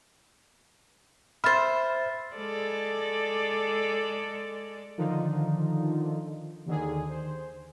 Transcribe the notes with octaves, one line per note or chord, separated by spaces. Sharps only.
C5 E5 B5 F6 A6
G#3 A4 D5
D3 D#3 F3 D#4 F4
D#2 D3 D#3 G#4
C5